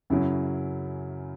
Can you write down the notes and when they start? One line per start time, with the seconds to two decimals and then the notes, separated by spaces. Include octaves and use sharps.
0.10 F#2 C#3 F#3 E4